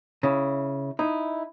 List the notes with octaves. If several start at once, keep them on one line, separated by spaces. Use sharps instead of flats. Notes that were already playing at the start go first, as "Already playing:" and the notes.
C#3 E4
D#4 E4